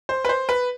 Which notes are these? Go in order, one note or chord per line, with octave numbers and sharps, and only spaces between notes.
C5
B4
C5
B4